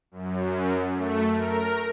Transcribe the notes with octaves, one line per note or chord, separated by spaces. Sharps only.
F#2
A3
A#4